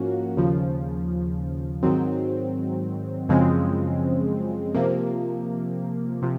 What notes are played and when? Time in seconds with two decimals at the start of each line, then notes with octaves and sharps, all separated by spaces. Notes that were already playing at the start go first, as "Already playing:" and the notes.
Already playing: G#2 F3 A#3 C#4 F#4
0.37 D#2 C#3 F3
1.83 G#2 D#3 F#3 C4
3.29 F#2 C#3 F3 G#3 C4
4.74 C3 F3 A#3
6.22 C3 F3